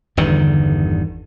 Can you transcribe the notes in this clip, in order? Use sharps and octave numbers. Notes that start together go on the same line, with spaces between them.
G1 E2 D3 D#3